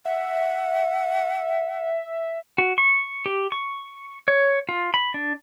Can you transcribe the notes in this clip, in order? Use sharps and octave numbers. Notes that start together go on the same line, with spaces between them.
E5 F#5
F#4
C#6
G4
C#6
C#5
F4
B5
D4